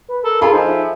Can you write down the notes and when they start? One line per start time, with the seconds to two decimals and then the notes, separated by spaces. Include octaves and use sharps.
0.09 B4
0.24 A4 A#4
0.41 F4 G#4 A4 B5
0.53 F3 D#4
0.68 E5